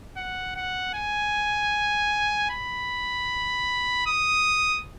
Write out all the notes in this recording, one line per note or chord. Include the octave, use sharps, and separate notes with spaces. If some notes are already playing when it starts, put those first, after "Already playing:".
F#5
F#5
G#5
B5
D#6